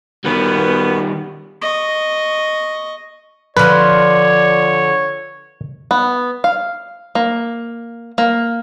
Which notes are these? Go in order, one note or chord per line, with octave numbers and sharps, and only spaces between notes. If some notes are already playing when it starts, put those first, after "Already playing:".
F#2 D#3 G3 B3
D#5 C#6
D3 F3 B4 C#5 D5
B3
F5
A#3
A#3